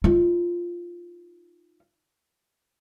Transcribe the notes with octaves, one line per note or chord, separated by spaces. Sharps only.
D#4 F4